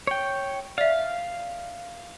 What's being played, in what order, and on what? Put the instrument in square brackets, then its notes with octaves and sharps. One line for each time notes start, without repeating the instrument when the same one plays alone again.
[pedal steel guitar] C#5 G5
[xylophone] D5 E5 [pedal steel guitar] F5